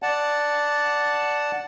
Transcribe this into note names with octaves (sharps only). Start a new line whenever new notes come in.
D5 F#5 A5